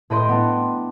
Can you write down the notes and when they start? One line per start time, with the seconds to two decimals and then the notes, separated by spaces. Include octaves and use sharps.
0.10 A2 B4 D#5 G5 C6
0.29 B3 D4